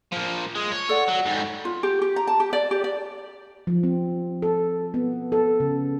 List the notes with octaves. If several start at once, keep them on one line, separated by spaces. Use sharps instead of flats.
F3 A#3 F4
G#3
C#5
A4 D5 F#5
F#3
G#2 G3
F4
G4
G4
A#5
A5
G4
D5
G4
D5
F3
C4
A4
B3
A4
C#3